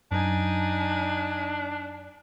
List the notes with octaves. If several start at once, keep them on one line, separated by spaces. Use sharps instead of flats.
F#2 D4 D#4 G#5